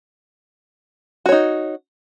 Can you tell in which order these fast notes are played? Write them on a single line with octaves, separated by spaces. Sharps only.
F#4 C#5 D#4